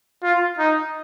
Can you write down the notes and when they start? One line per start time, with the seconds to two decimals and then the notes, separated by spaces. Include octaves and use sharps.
0.23 F4
0.59 D#4